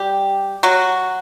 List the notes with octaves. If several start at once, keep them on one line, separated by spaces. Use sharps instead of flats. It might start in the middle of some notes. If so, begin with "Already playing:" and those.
Already playing: G3 G4
F#3 F#4